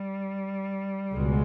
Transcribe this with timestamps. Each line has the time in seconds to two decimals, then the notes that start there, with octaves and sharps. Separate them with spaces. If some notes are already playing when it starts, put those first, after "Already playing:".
Already playing: G3
1.13 C#2 B2 G#3